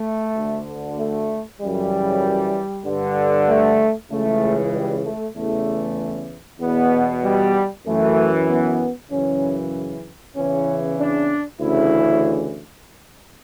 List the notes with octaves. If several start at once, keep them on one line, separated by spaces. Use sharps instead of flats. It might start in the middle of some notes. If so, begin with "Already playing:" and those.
Already playing: A3
D2 D3
A3
F#2 C#3 E3 G3
G2 D3
A3
C#2 C#3 E3 A3
G3
A3
E2 C#3 E3 A3
E2 B2 B3
G3
F#2 E3 A3
B3
F#2 C#3 E3 C#4
E2 C#3 E3 C#4
D4
D2 C#3 E3 E4